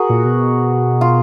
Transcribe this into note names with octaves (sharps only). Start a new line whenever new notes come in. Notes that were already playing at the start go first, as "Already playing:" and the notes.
Already playing: F#4 G#4 A#4
A#2
B2
F4